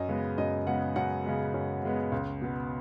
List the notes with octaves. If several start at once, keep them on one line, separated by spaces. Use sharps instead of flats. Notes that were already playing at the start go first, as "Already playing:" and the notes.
Already playing: F#2 D#5
C#3 G#3 B3
F#2 D#5
C#3 G#3 B3 F#5
F#2 F#5
C#3 G#3 B3
F#2
C#3 G#3 B3
C#2
B2 B3